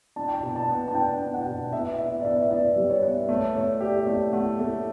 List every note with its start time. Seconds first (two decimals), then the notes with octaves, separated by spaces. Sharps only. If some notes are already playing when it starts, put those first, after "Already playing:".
0.16 D4 A5
0.27 G5
0.38 A5
0.42 B2
0.56 A5
0.69 B3
0.88 A5
0.95 D4 G5
1.20 D4
1.34 F#5
1.46 B2
1.72 B3 E5
1.99 E4 E5
2.20 D5
2.24 B3 E5
2.42 E5
2.51 B3 D5
2.76 G3
2.90 C#5
3.03 B3
3.29 A3 C#5
3.54 A3 C#5
3.80 G4 D5
3.88 E5
3.96 D5
4.07 A3 E5
4.33 A3 F#5
4.59 A3 A4